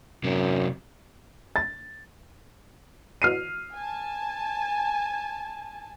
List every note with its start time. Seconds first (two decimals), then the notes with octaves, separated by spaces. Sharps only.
0.24 F#2 C3 F#3
1.56 A6
3.22 F6 C7 D#7
3.74 G#5 A5